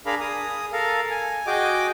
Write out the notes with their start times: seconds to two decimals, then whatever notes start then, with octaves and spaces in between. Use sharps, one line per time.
0.06 D4 G#4 A#4 F5 B5
0.20 G#4 D#6
0.72 A4 A#4 F5
1.10 G#5
1.47 F#4 G#4 D#5 G5 D6